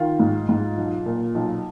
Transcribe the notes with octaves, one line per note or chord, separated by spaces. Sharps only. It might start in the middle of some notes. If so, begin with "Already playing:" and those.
Already playing: D#3 F4
G#2
G#2
B1
A#2
B1